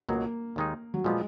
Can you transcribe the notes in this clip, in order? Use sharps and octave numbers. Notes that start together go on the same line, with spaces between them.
C#2 B2 F#3 A#3 B3 F#4
D#2 D#3 G#3 D#4
F#3
A#2 F3 G#3 B3